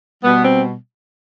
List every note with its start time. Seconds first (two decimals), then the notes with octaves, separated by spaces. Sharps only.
0.24 B2 G3 B3
0.45 C4